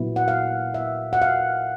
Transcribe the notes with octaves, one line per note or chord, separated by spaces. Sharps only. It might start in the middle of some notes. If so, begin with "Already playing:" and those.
Already playing: A#2 F#3 B3 E4
F#5
F5
E5
F#5
F5